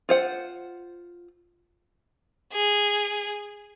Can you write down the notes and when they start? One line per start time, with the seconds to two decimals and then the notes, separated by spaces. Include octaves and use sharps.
0.09 F4 C5 F#5
2.53 G#4